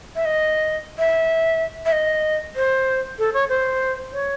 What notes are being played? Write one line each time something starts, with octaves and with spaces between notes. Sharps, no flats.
E5
D#5
E5
E5
D#5
C5
A4
C#5
C5
C#5